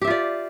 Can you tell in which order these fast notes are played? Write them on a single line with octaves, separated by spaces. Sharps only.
G4 E5 F4 D5